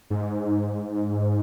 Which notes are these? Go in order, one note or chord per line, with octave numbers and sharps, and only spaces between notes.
G#2